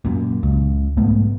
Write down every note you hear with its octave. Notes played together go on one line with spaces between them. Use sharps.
F#2 A#2
C#2
B1 G#2 A3 B3